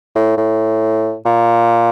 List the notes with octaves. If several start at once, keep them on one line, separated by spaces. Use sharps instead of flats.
A2
A2
A#2